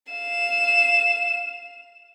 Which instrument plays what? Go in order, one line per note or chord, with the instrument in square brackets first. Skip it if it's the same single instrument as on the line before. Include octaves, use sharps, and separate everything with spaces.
[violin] F5 E7